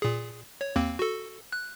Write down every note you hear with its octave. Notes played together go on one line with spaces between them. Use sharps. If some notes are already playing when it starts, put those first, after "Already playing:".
A#2 G#4
C#5
D#2 A#3 C4
F#4 A4
F#6